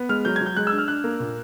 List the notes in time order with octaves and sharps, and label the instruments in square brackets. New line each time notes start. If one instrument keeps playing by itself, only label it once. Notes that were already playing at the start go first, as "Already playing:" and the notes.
Already playing: [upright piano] B3
G#3 F6
F#3 G6
G#6
F#3
G6
G#3 F#6
E6
D4
F6
D4 F#6
A#3
A#2